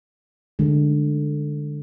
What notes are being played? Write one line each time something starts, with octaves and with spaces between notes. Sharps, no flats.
D3 G#3